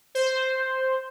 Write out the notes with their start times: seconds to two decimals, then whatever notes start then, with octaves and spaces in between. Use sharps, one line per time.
0.15 C5